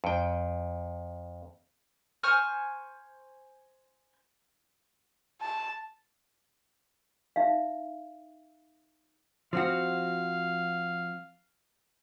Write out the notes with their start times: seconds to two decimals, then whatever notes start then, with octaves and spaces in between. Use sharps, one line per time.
0.04 F2 G5
2.23 C5 G#5 C#6 F6
5.41 A5
7.36 D#4 E5 F5
9.53 F3 C4 F#4 F5